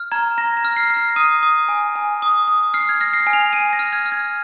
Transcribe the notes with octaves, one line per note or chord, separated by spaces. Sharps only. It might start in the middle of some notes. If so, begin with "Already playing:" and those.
Already playing: F6
A#5 G#6
A#5 A#6
A#6
F6
C7
F6
A#6
D#6 D#7
D#6
G#5
G#5
D#6
D#6
F6 C7
G#6
F6 A#6
C7
G#5
F7
G#5 D#7
A#6
F6
G#6
F6
G#6